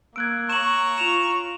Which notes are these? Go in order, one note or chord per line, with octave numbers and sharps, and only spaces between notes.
A#3 E6 F#6 G#6 D7
C#5 A#5 C#6 E7 F#7
F4 E7 F7